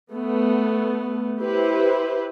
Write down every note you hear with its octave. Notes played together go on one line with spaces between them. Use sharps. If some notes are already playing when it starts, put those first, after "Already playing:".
A3 B3
E4 G4 B4 C5